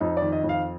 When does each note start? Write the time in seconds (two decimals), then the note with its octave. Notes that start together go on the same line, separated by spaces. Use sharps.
0.01 F2 D#4
0.17 D5
0.22 D#3
0.32 D#5
0.44 F2
0.49 F5